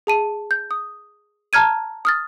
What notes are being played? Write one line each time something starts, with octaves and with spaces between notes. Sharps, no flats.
G#4 A5 D#7
G6
D#6
A5 A#5 F6 G#6 D#7
D#6 F6 A6